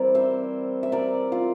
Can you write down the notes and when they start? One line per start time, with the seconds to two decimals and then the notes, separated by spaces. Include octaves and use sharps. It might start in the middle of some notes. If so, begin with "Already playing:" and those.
Already playing: E3 G3 C4 E4 A#4 D5
0.15 C5 E5
0.83 E5
0.92 A#4 D5
1.32 F4